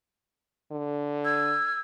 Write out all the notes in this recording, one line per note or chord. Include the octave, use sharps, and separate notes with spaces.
D3
E6 G#6